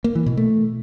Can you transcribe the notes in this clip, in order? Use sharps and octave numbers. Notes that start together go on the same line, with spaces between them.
A#3
E3
B2
A3